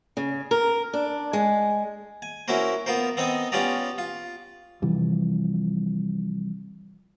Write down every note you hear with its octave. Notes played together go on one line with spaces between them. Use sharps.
C#3
A#4
D4
G#3
G#5
C#4 E4 F#4 A#4 C5
B3 F4 A#4 C5
B3 C4 D#4 D#5
B3 C#4 F4 G4 D5 A#5
F4
C3 E3 F3 G3